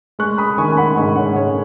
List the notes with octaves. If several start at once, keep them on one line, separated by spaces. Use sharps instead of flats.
G#3 C#6 F#6
B5 D#6
D#3 G#5 C#6
G#5
F#5 B5
G#2 G#5 C#6
C#5 F#5
G#2 C#5